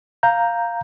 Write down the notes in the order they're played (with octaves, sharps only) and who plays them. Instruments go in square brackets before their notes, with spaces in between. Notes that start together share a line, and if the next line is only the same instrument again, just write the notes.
[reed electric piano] F5 A#5 G6